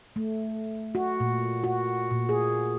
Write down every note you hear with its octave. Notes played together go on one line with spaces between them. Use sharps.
A3
F#4
A#2
F#4
A#2
G#4